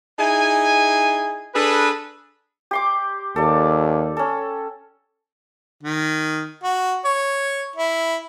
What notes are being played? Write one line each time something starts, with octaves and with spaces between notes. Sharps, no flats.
D#4 E4 G#4 G#5
D4 G#4 A4 B4
G4 C6 D6
D#2 A4 D5
C#4 A4
D#3
F#4
C#5
E4